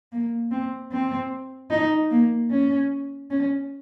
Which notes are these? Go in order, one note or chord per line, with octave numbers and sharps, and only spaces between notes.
A#3
C4
C4
D#4
A#3
C#4
C#4